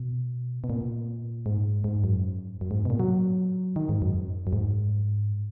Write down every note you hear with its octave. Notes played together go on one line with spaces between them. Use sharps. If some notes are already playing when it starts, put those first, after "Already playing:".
Already playing: B2
B2
A#2
G#2
G#2
F#2
F#2
G#2
B2
A#2
F#3
D#3
G#2
F#2
F#2
G#2